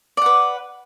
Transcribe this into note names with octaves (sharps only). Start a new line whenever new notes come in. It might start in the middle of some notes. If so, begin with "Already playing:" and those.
B4 D5 F#5